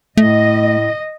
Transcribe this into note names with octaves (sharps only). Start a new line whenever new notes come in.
A2 A3 D#5